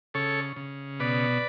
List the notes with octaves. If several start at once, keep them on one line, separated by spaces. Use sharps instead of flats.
C#3 A4 C#5
C#3
B2 B4 D5